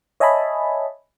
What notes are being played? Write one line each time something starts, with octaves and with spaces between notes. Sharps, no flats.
C#5 D#5 E5 G#5 A5 B5